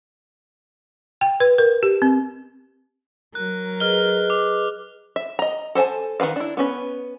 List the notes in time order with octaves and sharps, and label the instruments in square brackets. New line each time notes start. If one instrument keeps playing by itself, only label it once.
[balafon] G5
B4
A#4
G4
C4
[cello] F#3 A#4 [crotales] F#6
[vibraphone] G#4 B4 D#5 [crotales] F6 G7
[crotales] D6
[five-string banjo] E5
D#5 A#5
A4 C5 E5 G#5 A5
D#3 F#3 B4 F5
D4 E4
B3 C#4 B4